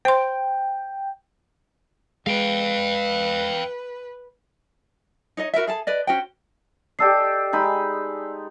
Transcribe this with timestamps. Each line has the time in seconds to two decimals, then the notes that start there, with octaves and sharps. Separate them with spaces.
0.05 C5 G5 C6
2.27 G#3 B4 F5 G5
5.37 D#4 C#5 D#5
5.54 F#4 A#4 B4 E5
5.67 G#4 A4 A5
5.87 B4 D5 D#5
6.07 C#4 F#4 C5 G5
6.99 G4 A4 D5 D#5 E6 C7
7.53 G#3 D#4 B5